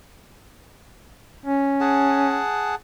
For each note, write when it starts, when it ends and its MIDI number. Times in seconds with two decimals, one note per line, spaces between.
1.46 2.40 61
1.81 2.75 68
1.81 2.75 78
1.81 2.75 81